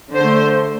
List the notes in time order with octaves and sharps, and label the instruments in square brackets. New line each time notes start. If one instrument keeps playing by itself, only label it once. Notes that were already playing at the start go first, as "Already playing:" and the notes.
[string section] D3 A3 C5